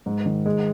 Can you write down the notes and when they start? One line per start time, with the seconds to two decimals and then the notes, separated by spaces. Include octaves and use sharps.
0.06 G#2
0.26 D#3
0.46 G#3